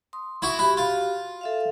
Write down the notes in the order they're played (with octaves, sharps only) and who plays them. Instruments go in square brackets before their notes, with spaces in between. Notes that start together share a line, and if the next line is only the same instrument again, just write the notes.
[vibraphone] C6 D#6
[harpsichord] E4 F#4
[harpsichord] E4 [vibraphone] F#4 G4
[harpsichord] F4
[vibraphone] A4 E5 F5